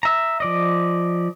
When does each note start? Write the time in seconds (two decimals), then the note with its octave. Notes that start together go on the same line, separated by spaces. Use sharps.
0.03 E5 A#5
0.40 F3 D5 D#5